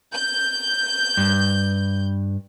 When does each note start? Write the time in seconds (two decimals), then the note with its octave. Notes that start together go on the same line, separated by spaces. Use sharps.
0.14 G6
1.17 G2